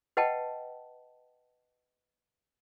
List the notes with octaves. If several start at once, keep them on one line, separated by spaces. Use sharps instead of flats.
B4 D#5 F#5 G5 A5